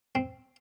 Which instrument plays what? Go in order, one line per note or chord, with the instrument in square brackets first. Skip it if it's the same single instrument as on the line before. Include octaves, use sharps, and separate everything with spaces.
[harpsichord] C4